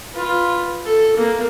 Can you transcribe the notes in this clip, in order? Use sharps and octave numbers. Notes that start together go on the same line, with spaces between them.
F4 B4
A4
A#3